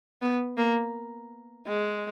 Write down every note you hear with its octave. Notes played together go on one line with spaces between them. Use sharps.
B3
A#3
G#3